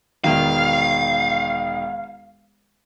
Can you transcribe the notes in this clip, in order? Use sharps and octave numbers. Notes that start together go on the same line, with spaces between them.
E1 D#3 F5